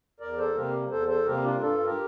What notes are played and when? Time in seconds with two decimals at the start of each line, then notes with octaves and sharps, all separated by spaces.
0.20 E2 A#4 D5
0.38 A4 C5
0.55 C3 G3 A#3 G4 A#4
0.91 E2 A4 C5
1.08 A4 C5
1.26 C3 G3 A#3 G4 A#4
1.43 D4 F4
1.61 G2 F4 A4
1.84 G4 A#4